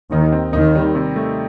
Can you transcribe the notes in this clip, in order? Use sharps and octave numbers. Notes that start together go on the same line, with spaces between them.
D#2 D#3 D#4
C4
D#2 D#3 D#4
G3
C3
A3